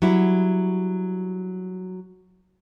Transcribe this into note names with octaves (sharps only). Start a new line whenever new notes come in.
F#3 G3 E4